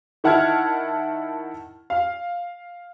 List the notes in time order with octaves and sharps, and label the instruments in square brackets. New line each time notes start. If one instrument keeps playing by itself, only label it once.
[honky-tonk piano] D#3 E4 F#5 A5 F6 G#6
F5